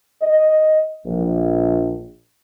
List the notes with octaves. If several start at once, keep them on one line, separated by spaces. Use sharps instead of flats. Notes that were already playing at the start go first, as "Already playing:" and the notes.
D#5
A#1